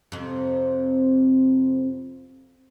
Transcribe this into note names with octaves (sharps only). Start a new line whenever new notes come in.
F2 C3